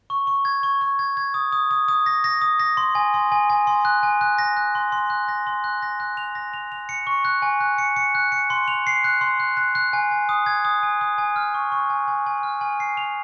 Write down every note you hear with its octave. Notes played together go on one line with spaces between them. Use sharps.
C#6
C#6
G#6
C#6
C#6
G#6
G#6
D#6
D#6
D#6
D#6
A#6
A#6
D#6
A#6
C6
G#5
C6
G#5
G#5
C6
F#6
G#5
F#6
A#6
F#6
C6
C6
F#6
A#6
C6
F#6
A#6
F#6
F7
A#6
F7
F7
C#7
C#6
F#6
G#5
F#6
C#7
C#7
F#6
C#7
C6
F7
C7
F#6
C6
F#6
F#6
F#6
G#5
G#5
D#6
G#6
D#6
G#5
D#6
G#5
F6
C#6
C#6
G#5
G#5
G#5
F6
G#5
C7
F7